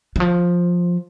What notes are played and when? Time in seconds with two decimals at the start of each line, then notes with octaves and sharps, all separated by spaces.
0.16 E3
0.20 F3